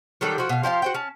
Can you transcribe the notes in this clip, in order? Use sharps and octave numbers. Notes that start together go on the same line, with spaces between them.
D#3 F#3 G3 A4
F3 F#4
B2 F5
F3 G4 D5 F5
F#4 C5 G5
C#4 A5